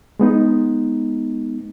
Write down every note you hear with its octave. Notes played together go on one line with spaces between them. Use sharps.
G#3 B3 D#4